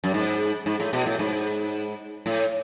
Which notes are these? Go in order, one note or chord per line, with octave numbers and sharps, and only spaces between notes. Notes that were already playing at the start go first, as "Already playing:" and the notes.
F#2
G#2
G#2
A2
B2
A2
G#2
A2